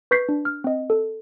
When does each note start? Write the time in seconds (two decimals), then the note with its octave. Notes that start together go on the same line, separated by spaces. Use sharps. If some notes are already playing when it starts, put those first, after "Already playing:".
0.11 B4 C#6 G6 B6 C7
0.29 D4
0.45 F6
0.64 C4 D#5
0.90 A4